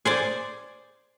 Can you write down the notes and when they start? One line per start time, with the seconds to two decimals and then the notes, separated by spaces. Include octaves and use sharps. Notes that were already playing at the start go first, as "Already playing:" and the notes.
0.05 G#4 C5 D5